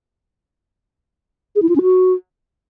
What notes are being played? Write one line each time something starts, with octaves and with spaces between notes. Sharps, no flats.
G#4
E4
F4
C#4
F#4